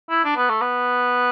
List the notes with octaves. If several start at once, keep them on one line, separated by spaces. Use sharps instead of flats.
E4
D4
B3
A3
B3